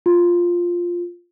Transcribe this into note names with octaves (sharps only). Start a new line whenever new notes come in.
F4